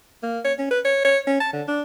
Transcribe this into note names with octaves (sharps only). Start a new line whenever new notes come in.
A#3
C#5
C#4
B4
C#5
C#5
C#4
A5
D3
D4